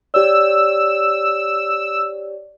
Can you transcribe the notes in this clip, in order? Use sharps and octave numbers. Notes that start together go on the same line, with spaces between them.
G4 C#5 D5 E6